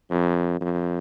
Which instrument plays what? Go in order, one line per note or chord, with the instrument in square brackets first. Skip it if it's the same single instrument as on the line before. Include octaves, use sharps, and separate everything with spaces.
[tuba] F2
F2